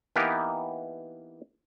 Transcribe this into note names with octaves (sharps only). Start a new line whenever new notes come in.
E3 A#3 B3 D#4 G4 A#4